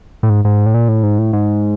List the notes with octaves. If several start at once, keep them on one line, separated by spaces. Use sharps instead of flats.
A2
G#2
G#2
A2
A#2
A2
G#2
A2
G#2